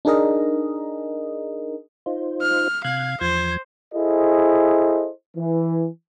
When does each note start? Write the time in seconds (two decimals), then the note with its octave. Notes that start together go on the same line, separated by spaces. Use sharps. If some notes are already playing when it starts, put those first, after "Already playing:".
0.05 D4 D#4 G#4 A#4 D#5
2.06 D#4 F4 C5
2.42 F6
2.84 C3 F5 F#6 G#6
3.21 E2 F3 C5 G#6
3.94 E4 G#4 A4 C5 D#5
5.37 E3